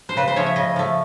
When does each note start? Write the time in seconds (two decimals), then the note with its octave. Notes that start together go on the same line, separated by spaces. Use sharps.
0.09 C5
0.17 C#3 B4
0.28 C5
0.36 F3 A3 C#5
0.46 E5
0.56 C#3 D#5
0.76 F3 A3